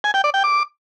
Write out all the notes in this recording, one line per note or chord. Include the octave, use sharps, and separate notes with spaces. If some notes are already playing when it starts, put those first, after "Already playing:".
G#5
G5
D5
G5
D6